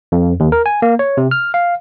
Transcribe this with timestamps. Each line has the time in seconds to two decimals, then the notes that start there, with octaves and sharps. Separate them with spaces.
0.12 F2
0.40 D#2
0.52 A#4
0.66 G#5
0.82 A#3
0.99 C#5
1.17 C3
1.31 F6
1.54 F5